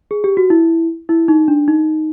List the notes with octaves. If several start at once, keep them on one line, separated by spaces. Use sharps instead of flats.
G#4
G4
F#4
E4
E4
D#4
D4
D#4